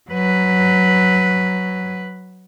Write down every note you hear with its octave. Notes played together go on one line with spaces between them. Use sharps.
F#3 B4